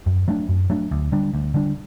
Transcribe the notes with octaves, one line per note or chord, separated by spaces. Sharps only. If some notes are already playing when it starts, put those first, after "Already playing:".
F#2
F#3 A3 D4
F#2
F#3 A3 D4
D2
D3 G3 D4
D2
D3 G3 D4